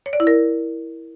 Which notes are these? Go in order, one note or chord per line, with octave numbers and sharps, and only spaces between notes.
C#5
D5
E4
A#4